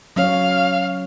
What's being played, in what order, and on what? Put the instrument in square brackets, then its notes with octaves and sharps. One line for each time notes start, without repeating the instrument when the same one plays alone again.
[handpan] F#3 C#4 C#5 [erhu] F5